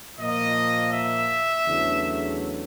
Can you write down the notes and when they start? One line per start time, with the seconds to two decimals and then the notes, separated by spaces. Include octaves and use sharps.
0.18 A#2 F3 A#3 D#5
0.92 E5
1.66 E2 C#3 F#3 A3 D4